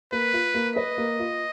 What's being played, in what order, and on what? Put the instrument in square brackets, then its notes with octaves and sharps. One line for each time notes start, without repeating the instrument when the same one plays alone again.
[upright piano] A#3 [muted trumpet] B4
[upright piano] F4
A#3
[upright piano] B4 [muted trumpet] D#5
[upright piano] A#3
F4